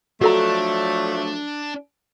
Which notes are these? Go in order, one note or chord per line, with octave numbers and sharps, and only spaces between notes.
F3 F#3 A3 D4 F#4 A4 A#5